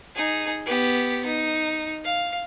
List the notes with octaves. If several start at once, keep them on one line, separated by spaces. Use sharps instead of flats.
D#4 G#4
B3 G4
D#4
F5